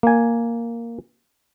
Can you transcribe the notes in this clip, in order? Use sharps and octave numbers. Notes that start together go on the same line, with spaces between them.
A#3 G#5